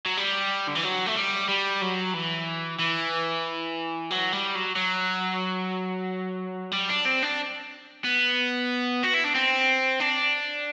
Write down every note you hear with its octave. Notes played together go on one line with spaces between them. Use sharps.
F#3
G3
D3
E3
F#3
A3
G3
G3
F#3
E3
E3
F#3
G3
F#3
F#3
G3
D4
C4
D4
B3
F#4
E4
D4
C4
D4